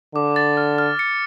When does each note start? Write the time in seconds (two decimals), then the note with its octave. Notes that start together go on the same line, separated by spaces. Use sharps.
0.15 D3 D6
0.36 A6
0.57 F6
0.78 F6
0.99 C#7